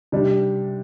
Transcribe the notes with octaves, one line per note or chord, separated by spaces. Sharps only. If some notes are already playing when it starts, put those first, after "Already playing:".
C3 G3 D4